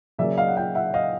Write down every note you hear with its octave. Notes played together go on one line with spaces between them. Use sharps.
C#3 F#3 A#3 D5 E5
D#5 F5
F#5
F5 G5
E5 F#5
D#5 F5